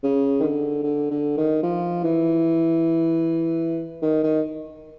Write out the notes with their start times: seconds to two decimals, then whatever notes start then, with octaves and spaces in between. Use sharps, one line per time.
0.03 C#3
0.40 D#3
0.43 D3
0.83 D3
1.11 D3
1.37 D#3
1.63 F3
2.04 E3
4.02 D#3
4.23 D#3